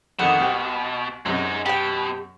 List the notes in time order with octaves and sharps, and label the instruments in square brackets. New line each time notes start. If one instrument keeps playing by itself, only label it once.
[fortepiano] F2 D3 D#3 [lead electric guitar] B2 [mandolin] F#5
[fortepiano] C2 G4
[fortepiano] F#2 C3 [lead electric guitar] G#3 D#4
[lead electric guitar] B2 [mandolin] G4 G5